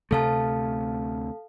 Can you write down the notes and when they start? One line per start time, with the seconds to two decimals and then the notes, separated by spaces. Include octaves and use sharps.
0.11 D2 C3 A3 A4 F5 A5